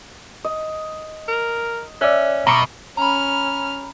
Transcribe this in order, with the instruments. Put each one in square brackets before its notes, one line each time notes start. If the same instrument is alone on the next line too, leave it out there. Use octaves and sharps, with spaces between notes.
[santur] D#5
[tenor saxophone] A#4
[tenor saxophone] C#4 [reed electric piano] D5 F#6 [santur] E5
[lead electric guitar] B2 [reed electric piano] A#5 C#6 D6
[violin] C#4 F6 [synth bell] A#5 B5